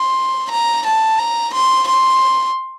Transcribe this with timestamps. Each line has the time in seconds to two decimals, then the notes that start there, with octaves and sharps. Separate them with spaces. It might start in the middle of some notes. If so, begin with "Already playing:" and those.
Already playing: C6
0.51 A#5
0.86 A5
1.19 A#5
1.54 C6
1.88 C6